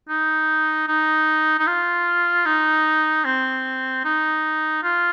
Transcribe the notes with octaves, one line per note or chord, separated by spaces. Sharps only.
D#4
D#4
D#4
F4
D#4
C4
D#4
F4